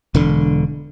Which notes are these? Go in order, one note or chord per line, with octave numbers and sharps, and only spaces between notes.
E1 D3